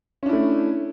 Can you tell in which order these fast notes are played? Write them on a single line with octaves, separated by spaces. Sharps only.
C#4 D4 E4 A3